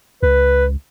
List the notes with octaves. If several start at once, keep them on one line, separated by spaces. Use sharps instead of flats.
C#2 B4